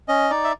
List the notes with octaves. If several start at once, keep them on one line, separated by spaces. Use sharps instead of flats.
C#4 D#5
D#4 D5
E5